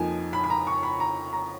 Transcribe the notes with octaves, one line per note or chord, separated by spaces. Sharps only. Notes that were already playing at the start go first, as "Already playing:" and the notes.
Already playing: F2 F3 A#3 D#4 G#5
B5
B5
A#5
C#6
B5
A#5
A#5